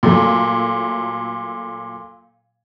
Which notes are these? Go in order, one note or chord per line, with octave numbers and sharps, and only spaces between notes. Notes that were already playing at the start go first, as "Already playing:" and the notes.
A#2 F#3 A3